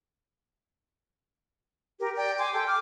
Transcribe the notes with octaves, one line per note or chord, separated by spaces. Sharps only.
G4 A#4
D5 G5
G#5 C6 D6
G4 A4 G5
D6 F6